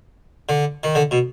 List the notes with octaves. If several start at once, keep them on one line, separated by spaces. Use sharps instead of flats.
D3
D#3
D3
B2